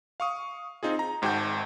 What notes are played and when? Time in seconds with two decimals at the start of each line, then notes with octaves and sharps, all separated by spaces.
0.20 F5 C#6 D#6
0.83 C4 D#4 F4 G#4
0.99 A#5
1.22 G#1 G#2 F#4 G5 A5 G6